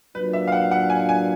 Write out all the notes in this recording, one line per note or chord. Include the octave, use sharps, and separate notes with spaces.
F#3 A#3 D4 F4 B4
E5
F5
F#5
F#5
G#5
G#5